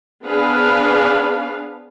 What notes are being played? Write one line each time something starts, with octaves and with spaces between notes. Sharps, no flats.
B3 C4 D4 G#4 B4 F5